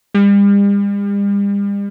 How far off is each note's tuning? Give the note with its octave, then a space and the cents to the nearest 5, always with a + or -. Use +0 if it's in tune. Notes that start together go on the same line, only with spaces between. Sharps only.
G3 +45